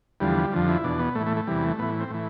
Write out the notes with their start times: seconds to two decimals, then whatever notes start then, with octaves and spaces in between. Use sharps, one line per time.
0.20 E2 D3 F3 G3
0.52 F2 D3 F3
0.68 E4
0.84 E2 B2 D4
0.99 B3
1.15 A2 E3 A3
1.27 A3
1.37 A3
1.47 E2 C3 E3 G3
1.63 A3
1.79 A2 E3 B3
2.00 C4
2.11 A2 E3